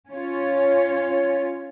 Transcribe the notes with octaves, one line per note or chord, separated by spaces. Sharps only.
C#4 F4 C#5